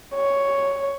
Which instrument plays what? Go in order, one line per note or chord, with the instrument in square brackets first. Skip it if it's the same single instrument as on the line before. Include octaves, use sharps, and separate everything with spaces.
[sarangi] C#5